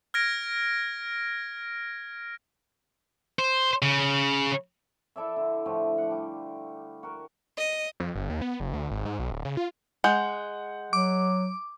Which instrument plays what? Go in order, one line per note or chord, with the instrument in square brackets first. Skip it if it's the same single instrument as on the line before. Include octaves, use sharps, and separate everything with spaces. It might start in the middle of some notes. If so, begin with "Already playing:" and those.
[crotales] F6 G#6 A#6 D7
[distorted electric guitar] C5
C#3
[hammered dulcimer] E4 A4 D5 E5
D3
A2 D3 F3 A3
F#5 D6
G3
F#4 A#4
[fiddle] D#5
[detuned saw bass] F2
G1
D#2
B3
F#1
D2
G#1
G#2
B1
D1
C#3
F4
[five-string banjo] G#3 [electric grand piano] F#5 G6
[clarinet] F#3 [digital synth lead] D6